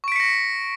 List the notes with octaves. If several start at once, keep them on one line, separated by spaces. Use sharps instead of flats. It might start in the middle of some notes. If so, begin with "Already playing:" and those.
C#6 A#6 B6 C#7 D7